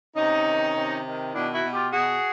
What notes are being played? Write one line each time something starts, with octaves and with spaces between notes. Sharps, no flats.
C3 C#4 D#4
D#3
C3
D#3
B2 D4 E4
E4 F#4
B2
F4 G4
B2 F#4 G#4